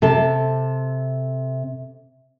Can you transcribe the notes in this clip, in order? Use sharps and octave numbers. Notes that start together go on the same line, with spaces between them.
C3 A4 A5